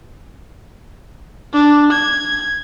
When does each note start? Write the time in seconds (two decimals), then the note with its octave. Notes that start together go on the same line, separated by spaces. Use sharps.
1.53 D4
1.92 G#6